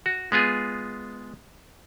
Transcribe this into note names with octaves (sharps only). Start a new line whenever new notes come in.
F#4
G#3 B3 F4 G#4